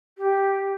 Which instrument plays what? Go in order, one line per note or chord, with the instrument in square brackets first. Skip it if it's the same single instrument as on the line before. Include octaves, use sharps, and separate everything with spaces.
[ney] G4